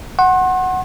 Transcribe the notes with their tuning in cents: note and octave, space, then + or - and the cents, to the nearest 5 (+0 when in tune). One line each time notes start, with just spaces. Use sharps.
F#5 +0 C6 +40